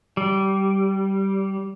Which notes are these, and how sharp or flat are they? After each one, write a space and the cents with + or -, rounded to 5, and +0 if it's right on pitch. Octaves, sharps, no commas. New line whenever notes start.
G3 -15